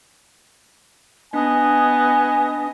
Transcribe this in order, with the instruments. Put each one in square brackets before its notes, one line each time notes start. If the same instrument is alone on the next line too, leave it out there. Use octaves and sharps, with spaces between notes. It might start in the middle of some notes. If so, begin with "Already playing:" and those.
[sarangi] B3 [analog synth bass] D4 [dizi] D#5 [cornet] G#5